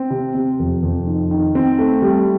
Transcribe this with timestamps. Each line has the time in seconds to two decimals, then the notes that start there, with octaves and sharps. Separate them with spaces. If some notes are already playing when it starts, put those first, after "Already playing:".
Already playing: C4
0.10 C3
0.35 C3
0.59 F2
0.83 F2
1.07 D#3
1.31 D#3
1.55 C4
1.78 A3
2.02 G3